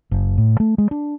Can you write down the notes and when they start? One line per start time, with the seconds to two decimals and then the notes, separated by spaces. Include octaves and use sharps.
0.11 F#1
0.38 A2
0.60 A3
0.78 G#3
0.91 D4